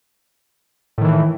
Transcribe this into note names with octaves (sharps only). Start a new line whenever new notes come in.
A2 D#3 E3